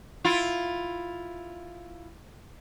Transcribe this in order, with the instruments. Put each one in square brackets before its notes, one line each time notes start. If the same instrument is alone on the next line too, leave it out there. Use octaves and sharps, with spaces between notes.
[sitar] E4 F4